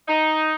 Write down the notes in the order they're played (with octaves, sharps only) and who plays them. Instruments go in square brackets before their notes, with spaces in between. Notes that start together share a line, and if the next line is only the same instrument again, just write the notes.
[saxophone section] D#4